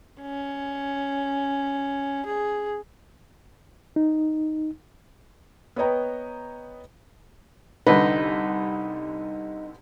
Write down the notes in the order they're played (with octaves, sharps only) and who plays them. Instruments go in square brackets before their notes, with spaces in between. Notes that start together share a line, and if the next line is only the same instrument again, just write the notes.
[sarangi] C#4
G#4
[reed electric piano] D#4
[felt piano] B3 B4 C#5 D#5 G5 A#5
[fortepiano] C2 D3 B4 [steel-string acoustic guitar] D#4